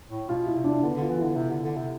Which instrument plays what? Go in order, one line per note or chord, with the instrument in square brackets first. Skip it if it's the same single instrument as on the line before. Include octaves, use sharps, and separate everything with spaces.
[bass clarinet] A2
[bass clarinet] B2 [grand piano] F4
[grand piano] E4
[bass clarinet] C3
[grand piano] D4
[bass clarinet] D3 [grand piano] B3
[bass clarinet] D3
[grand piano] F4
[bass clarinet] E3
[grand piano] E4
[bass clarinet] D3
C3
D3
D3
C3